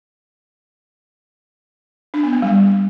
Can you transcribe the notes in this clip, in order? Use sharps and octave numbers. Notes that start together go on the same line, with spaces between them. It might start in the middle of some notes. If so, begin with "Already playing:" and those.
D4
B3
A#3
G3